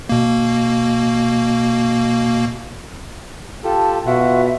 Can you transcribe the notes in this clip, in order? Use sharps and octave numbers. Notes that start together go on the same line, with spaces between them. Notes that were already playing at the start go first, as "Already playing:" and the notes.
B2 A#3
F4 G4 A4 A5
B2 F4 F#4 E5 F#5